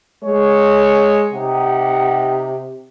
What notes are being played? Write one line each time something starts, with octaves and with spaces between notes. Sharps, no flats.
G#3 C#5
C3 D#4 G4 F#5